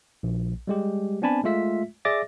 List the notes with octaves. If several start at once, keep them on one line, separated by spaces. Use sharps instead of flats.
A#1
G3 G#3 G4
B3 C4 D4 G#5 A5 B5
G#3 A3 F4 E5 B6
G#4 D5 E5 D6 A6 A#6